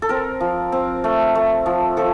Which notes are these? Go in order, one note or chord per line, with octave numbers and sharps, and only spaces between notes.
A4
C4 A#4
F3
C4
A3
A3
F3
F3 A4